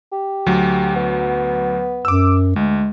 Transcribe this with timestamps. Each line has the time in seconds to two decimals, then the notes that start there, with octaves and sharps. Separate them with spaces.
0.12 G4
0.46 D2 F#3
0.95 B3
2.05 F#2 D6 E6
2.56 D2 G#3